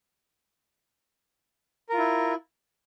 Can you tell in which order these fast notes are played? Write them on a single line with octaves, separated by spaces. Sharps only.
A#4 F4 E4